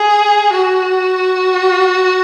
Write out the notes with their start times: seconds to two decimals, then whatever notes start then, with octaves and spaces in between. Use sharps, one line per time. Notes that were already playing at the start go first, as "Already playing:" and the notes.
Already playing: G#4
0.53 F#4